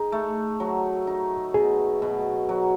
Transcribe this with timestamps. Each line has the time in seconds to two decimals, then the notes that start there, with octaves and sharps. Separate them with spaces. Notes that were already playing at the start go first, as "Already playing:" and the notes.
Already playing: D#4 G#4
0.12 A3
0.60 F#3
1.07 D#4
1.54 B2 G#4
2.02 B2
2.49 F#3